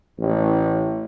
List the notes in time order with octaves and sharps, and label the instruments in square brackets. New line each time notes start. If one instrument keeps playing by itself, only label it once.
[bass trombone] A1